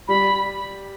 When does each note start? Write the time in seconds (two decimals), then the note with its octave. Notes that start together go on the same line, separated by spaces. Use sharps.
0.08 G3 B5